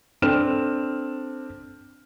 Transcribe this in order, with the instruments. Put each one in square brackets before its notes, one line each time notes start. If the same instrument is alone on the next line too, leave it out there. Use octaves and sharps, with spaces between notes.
[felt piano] C4 D4 A4 F6 E7